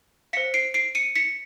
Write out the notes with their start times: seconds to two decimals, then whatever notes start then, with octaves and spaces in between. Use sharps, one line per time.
0.33 C5 F5 B6 C#7
0.54 C7 D7
0.74 C7 D7
0.95 C#7 D#7
1.16 B6 C#7